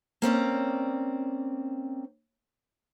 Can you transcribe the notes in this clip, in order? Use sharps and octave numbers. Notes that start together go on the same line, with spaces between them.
A#3 C4 C#4 D5